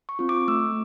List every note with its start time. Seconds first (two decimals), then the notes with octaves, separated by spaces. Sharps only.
0.09 C#6
0.19 C4 F4
0.29 D6
0.48 A3 E6